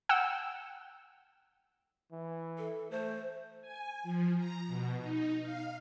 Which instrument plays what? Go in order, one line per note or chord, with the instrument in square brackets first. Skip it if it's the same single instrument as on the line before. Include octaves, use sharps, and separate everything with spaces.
[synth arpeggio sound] F#5 G5 E6
[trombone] E3
[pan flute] A4
[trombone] A3 [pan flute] C5
[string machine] G#5
F3
A#5
B2
D#4
F5